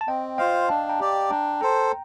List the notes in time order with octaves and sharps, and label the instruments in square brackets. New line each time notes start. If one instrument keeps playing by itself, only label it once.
[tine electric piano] A5
[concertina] C4 [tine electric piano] D#5 G5
[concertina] F4 C5 F5 [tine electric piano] D#5 G5
[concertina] D4 [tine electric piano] F5 A5
[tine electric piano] G5 A#5
[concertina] G4 D5
[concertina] D4 [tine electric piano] G5 A#5
[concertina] A4 C5 [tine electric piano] G5 A#5